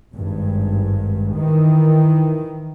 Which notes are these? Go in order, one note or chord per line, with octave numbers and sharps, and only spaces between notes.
G#1 G2
D#3 E3